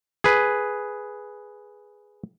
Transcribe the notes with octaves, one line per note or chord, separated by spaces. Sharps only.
G#4 B4